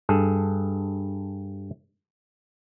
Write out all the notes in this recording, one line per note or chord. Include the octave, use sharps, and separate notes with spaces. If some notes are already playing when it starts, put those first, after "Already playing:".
G2 G#4 A4